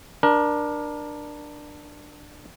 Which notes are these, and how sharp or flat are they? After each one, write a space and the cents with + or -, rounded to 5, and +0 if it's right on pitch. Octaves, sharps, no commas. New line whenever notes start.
D4 +10 A#4 +30